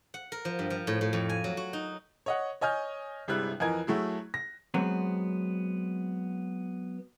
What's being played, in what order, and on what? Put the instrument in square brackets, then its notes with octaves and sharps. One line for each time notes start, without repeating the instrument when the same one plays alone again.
[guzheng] F#5
A#4
F3
G2
F3
A2
A2
F2
G#5
F#3
F#4
D#4
[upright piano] C#5 D#5 F#5
C#5 D#5 G#5 F6 G6
G1 C3 G3 G#3 E4 F#6
F2 E3 A#4 D#5 G#5 G#6
F#3 A3 E4 G#4
A#6
[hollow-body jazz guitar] F#3 G#3 B3 C4